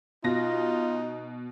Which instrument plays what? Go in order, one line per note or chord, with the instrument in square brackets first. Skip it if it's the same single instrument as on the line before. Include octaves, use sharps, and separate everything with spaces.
[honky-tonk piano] B2 A#6 [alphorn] D#4 [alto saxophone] F4